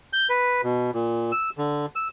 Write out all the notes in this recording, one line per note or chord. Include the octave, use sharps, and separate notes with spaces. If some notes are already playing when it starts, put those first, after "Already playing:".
G6
B4
B2
A#2
E6
D3
E6